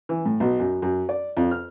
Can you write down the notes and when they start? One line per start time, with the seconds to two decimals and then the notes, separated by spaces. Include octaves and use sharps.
0.09 E3
0.26 A2
0.40 B1
0.60 F#2
0.82 F#2
1.09 D5
1.37 F2
1.51 F6